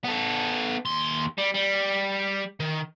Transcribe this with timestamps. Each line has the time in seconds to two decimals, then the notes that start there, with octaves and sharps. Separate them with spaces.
0.04 B3 A4
0.85 D#2 C6
1.38 G3
1.54 G3
2.60 D#3